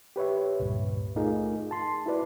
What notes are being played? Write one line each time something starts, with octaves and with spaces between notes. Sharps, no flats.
G4 B4 C#5 E5
C#2 G2 A#2
A3 D#4 F4 G#4 A#4
A5 C6
E4 F#4 B4 D5